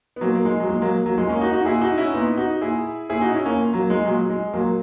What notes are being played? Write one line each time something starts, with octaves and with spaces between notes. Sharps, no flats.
B3
A#2 F#3 A#3
A#3
G#3
F#3
A#2 G#3
F#3 A#3
F#3 A#3
A#2 G#3
A#3 C#4
D#4 F#4
D#4 F#4
A#2 E4 G#4
D#4 F#4
C#4 E4
A#2 B3 D#4
D#4 F#4
A#2 E4 G#4
A#2 E4 G#4
D#4 F#4
C#4 E4
A#3 C#4
A#2
F#3 A#3
G#3
A#2 F#3
G#3
A#2 F#3 A#3